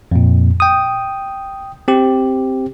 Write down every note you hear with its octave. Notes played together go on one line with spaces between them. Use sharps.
F2 A#2
G5 D#6
C4 G4